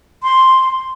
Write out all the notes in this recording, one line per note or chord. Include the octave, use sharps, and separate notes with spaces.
C6